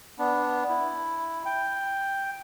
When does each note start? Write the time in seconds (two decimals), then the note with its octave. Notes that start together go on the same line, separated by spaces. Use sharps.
0.19 B3 D4
0.69 E4
1.45 G5